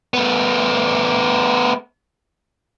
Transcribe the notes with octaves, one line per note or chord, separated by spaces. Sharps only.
A3 B3